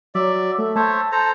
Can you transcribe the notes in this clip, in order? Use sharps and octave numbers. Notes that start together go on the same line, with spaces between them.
F#3 D5 E5
A3 E5
C5 C#5 E5 A5
A4 C5 A#5